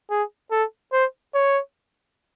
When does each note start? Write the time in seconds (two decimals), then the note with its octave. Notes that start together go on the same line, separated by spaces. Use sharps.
0.10 G#4
0.51 A4
0.92 C5
1.34 C#5